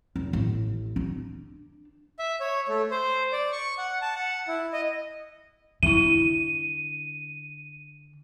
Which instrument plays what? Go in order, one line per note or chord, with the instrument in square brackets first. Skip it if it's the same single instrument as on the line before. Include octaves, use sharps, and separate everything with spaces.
[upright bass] F1
A1
D4
[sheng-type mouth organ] E5
C#5
A3
C5
D5
C#6
F#5
A5
F#5
E4
D#5
[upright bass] D3 [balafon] G3 E4 [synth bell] D#7